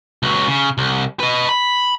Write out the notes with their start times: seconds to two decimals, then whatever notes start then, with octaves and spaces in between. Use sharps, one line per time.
0.23 C#2 F#3
0.48 C#3
0.78 C2
1.20 B4 D#5
1.49 B5